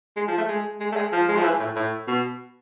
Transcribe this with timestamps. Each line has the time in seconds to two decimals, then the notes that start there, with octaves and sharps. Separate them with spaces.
0.17 G#3
0.28 F3
0.38 A3
0.49 G#3
0.80 G#3
0.92 A3
0.96 G#3
1.13 F3
1.28 G#3
1.36 F3
1.44 E3
1.60 A2
1.76 A2
2.08 B2